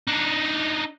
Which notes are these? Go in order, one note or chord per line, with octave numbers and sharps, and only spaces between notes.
D4 D#4